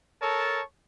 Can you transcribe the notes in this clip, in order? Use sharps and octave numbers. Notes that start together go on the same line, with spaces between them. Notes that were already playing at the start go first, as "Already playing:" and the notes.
A4 A#4 C#5 A5